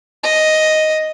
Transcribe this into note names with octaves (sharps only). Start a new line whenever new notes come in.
D#5